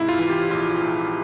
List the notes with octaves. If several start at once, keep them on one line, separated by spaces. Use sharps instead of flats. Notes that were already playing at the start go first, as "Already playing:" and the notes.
Already playing: G#2 C3 E4
F4
E3
G4
A#1 F4
A#1